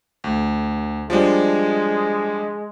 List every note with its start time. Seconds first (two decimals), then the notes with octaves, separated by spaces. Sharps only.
0.24 D2
1.10 F3 G3 G#3 D4